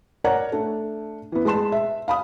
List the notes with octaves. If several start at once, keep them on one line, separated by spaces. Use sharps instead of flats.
A#4 C#5 D5 F#5 A#5
A3 D4
E3 B3
G#3 B4 A5 C6 E7
E5
F5 B5 D#6